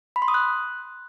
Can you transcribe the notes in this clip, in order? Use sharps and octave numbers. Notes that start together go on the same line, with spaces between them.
B5
C6
D#6
F#6